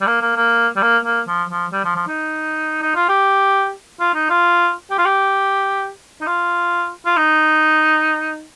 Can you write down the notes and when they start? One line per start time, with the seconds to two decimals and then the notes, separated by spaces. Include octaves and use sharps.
0.01 G3
0.07 A#3
0.21 A#3
0.36 A#3
0.76 G3
0.82 A#3
1.05 A#3
1.28 F3
1.50 F3
1.73 G3
1.85 F3
1.96 F3
2.08 D#4
2.82 D#4
2.96 F4
3.09 G4
4.00 F4
4.15 D#4
4.30 F4
4.91 G4
4.98 F4
5.06 G4
6.21 D#4
6.27 F4
7.06 F4
7.17 D#4